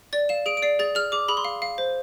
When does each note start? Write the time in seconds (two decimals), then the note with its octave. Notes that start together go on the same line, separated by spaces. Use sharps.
0.13 D5 A6
0.29 F5 E7
0.46 G#4 D7
0.57 D7
0.62 D5 C7
0.79 G#4 A6
0.95 G#4 F6
1.12 G#4 D6
1.28 G#4 B5
1.37 C6
1.45 F5
1.62 F5
1.78 C5